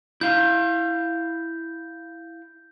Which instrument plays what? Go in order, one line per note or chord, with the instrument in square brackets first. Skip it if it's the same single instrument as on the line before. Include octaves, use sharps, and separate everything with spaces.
[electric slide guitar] E4 F5 [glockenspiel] G6